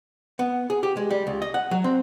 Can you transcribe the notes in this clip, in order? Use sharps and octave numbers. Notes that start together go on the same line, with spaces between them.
B3
G#4
G4
G#3
G3
C#2
D#5
F#5
F#3
C4